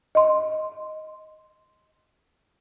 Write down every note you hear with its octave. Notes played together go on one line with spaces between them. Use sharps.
D#5 C6